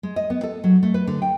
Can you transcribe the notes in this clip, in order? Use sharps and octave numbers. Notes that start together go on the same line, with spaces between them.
G#3
D#5
B3
A4
F#3
A3
B4
D3
G5